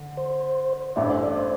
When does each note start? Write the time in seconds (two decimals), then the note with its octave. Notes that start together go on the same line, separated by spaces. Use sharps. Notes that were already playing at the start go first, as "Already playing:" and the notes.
Already playing: D3
0.17 C5
0.96 A1 G2 E3 A3 E4 D5
1.10 C5
1.23 D5
1.36 C5